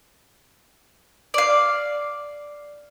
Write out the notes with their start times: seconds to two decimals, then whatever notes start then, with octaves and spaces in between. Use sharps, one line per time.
1.34 D5 F5